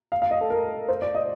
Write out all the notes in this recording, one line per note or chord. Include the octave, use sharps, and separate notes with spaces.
F5
F5
D#5
A4
A#4
C5
D5
D#5